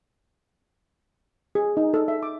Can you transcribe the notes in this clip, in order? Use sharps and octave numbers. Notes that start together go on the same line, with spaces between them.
G#4
D#4
A4
E5
D6